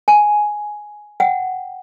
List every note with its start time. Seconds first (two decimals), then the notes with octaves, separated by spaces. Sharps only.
0.08 G#5
1.20 F#5 G5